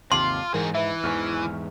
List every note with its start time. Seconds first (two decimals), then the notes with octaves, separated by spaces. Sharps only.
0.12 G#1 D#2 C3 F4 A5 C6 D6 C7
0.54 G#2 E3 C4 G#4 A#4
0.75 E3 B4 E5
1.04 E2 G#2 G#5 C#6 F6